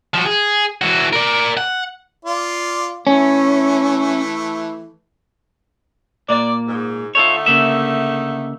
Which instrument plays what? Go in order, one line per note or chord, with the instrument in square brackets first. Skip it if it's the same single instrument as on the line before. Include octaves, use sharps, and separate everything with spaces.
[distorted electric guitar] F3 F#4
G#4
E3 F#4
A#4 D5
F#5
[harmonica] F4 D5
[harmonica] E3 A3 [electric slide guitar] C#4
[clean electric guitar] A#2 A#3 [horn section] D5
[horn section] G#2
[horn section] D3 A3 D#4 [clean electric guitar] F4 A4 C#5
[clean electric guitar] C#3 A#3 E5